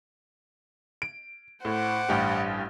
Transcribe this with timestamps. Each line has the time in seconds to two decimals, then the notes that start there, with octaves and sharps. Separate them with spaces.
1.02 D7
1.65 A2 C5 F#5 D6
2.09 A1 G2 G4